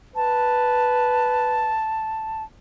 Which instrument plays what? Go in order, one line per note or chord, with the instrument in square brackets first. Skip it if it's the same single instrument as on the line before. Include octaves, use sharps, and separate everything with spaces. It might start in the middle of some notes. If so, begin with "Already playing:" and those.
[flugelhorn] B4 [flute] A5